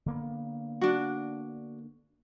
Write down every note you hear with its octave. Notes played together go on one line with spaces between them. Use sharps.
D3 A#3 B3
D4 F#4